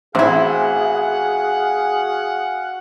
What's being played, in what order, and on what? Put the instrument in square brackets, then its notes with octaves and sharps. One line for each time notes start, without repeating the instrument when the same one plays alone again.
[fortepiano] A1 [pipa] C4 E4 [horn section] F#4 F5 F#5 [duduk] G#4